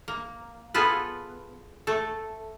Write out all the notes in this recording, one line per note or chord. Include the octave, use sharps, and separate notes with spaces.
A#3
B3 F4 G#4 A4 B4
A3 A4